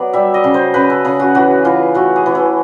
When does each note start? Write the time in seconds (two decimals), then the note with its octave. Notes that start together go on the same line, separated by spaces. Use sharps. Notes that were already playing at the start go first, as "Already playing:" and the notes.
Already playing: F#3 B3 D5
0.13 G3 E5
0.34 D#5
0.44 C#3
0.54 C5
0.74 C#3 B4
0.90 A4
1.05 C#3 G#4
1.20 F#4
1.35 E3 F#4
1.65 E3 F4
1.94 A3 F#4
2.16 G#4
2.26 E3
2.35 A4